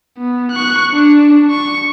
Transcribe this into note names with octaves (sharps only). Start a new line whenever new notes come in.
B3
C#6 F#6
D4
C#6